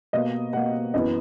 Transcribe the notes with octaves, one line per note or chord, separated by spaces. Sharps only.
B2 A#3 D#5
B2 A#3 F#5
F#2 E3 B3 D#5